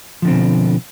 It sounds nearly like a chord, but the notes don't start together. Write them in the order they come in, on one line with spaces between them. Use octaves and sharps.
F3 D3 C4 B2